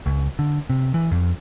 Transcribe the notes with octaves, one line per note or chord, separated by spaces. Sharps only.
C#2
D3
C3
E3
F2